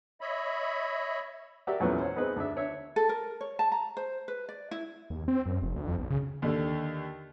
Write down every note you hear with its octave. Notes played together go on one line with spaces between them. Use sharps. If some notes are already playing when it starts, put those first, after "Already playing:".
C#5 D#5 E5 B5
F#4 G4 A#4 D5 E5
E2 A#2 F#3 A3 B3 C#4
C5 C#5 F#5
B3 C4 D#4 G#4 B4
D2 D4 E5
D4 C#5 E5
A4
A#4
C#5
A5
A#5
C5
B4
D5
E4
D#2
C4
F#2
F1
D2
F2
B1
C#3
D#2 D3